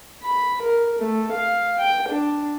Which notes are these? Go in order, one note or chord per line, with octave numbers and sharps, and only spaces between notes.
B5
A#4
A3
F5
G5
D4